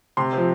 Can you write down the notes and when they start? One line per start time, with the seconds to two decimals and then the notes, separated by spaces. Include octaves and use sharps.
0.17 C3 C6
0.33 F3 C4